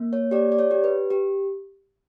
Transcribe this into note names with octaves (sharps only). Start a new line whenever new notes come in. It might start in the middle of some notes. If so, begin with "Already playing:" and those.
Already playing: A#3
C#5
G4 D5
D5
C#5
G4
B4
G4